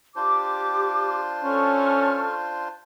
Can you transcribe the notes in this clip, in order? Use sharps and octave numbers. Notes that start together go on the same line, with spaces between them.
D4 F4 G4 C5 D6
C#4 A4 C#6 F6